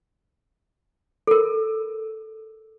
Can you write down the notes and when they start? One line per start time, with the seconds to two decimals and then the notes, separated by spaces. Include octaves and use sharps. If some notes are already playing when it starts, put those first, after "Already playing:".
1.27 A4 A#4